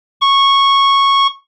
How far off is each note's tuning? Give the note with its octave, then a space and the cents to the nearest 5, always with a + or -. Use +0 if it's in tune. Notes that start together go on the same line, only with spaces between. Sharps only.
C#6 -10